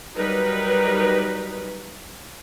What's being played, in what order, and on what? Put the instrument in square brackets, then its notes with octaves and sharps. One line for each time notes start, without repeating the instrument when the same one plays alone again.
[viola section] F#3 G3 D#4 A#4 B4